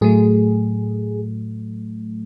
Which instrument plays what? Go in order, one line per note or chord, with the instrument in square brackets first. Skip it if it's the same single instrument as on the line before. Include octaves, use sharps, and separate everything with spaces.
[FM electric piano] A2 F#3 A3 G#4